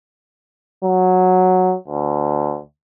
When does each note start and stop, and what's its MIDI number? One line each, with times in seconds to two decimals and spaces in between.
0.84 1.75 54
1.88 2.59 38